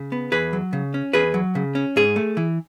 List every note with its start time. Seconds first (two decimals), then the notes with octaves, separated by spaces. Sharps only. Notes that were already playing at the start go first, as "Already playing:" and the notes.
Already playing: C#3
0.12 B3
0.32 E2 G#4 B4
0.53 F#3
0.73 C#3
0.94 C#4
1.13 E2 G#4 B4
1.34 F#3
1.55 C#3
1.75 C#4
1.96 G#2 G#4
2.16 A3
2.37 E3